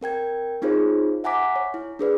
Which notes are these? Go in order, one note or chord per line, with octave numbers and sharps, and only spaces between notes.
C4 A#4 G5 G#6
C4 D#4 F4 G#4 C5 C#5
E5 F#5 G#5 A#5 D6 B6
C#5
E4
D4 G#4 B4 D5